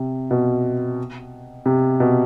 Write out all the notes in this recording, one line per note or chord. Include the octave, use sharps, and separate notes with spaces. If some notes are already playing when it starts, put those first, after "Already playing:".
Already playing: C3
B2
C3
B2